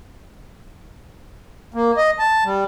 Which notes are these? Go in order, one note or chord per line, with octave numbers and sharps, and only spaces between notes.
A#3
D#5
A5
G3